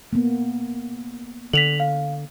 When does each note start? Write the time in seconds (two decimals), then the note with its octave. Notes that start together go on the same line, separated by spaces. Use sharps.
0.13 A#3 B3
1.53 D3 B6 F7 F#7
1.80 F5